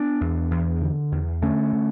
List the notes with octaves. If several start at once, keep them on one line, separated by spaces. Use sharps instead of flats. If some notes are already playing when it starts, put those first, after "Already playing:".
Already playing: B3 D4
E2
E2
D3
E2
D3 A3 C#4
D3